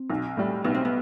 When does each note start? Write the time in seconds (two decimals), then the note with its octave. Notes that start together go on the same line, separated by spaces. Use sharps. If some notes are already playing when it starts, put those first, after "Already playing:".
Already playing: C4
0.10 B1
0.37 A2 G3
0.64 B1 B3
0.75 C4
0.85 B3